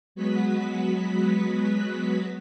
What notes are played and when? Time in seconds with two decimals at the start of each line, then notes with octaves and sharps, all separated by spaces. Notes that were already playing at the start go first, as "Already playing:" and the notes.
0.15 F#3 G#3 B3 F#4 B4 B6